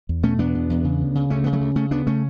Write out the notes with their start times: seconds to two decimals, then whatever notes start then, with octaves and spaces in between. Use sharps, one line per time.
0.09 E2
0.23 B2 A3 C#4
0.38 E2 B3 D4
0.55 B2
0.70 E2
0.84 C#3
1.00 D2
1.15 C#3
1.30 D2 A3 C#4
1.44 C#3 B3
1.53 F#3 A3
1.61 D2
1.76 C#3 A3 C#4
1.91 D2 B3 D4
2.07 C#3 A3 C#4